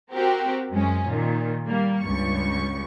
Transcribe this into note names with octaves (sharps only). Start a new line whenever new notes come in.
C4 F#4 G4 A#4
F#2 G#3 C#4
A#2 D#3
G3 A#3
C#2 G2 C#6